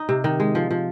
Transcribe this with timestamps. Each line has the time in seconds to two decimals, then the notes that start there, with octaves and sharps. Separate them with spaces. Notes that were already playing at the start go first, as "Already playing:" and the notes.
Already playing: D#4
0.09 C3
0.24 D#3
0.40 G#3
0.55 F3
0.71 F3